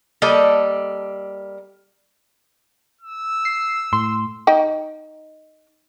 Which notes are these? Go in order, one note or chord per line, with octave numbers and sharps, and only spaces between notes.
G3 A#3 A4 D#5
E6
C7
A2 C6
D#4 G5